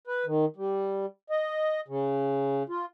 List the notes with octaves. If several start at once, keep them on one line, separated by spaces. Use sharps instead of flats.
B4
D#3
G3
D#5
C#3
F4